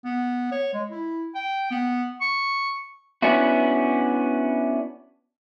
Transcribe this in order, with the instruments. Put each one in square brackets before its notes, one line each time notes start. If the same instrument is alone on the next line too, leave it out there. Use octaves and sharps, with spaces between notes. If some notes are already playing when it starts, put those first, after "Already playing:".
[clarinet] B3
C#5
G#3
E4
G5
B3
C#6
[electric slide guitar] B3 C#4 D4 E4 F#4